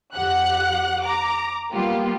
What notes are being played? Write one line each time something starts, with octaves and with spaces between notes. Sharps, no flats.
F2 G4 F#5 F#6
A#5 D6
G3 A#3 B3 F4 G4